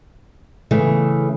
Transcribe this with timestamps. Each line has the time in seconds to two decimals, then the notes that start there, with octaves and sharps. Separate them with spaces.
0.71 C#3 E3 A3